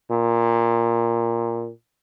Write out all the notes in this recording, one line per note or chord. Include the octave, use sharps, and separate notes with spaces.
A#2